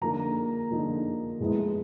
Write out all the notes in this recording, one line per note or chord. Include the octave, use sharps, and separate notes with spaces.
D3 F3 A#3 D#4 A#5
D3 F3 A#3 D#4
A2 F3 G#3 B3 E4